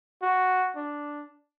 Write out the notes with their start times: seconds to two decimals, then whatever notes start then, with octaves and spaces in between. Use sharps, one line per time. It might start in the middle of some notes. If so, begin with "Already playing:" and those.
0.22 F#4
0.76 D4